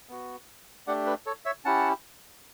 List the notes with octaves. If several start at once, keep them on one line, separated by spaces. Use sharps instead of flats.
B3 F#4
A3 D4 G4 D5 F#5
B4
A4 C#5
C#5 E5
C#4 E4 G4 F#5 A5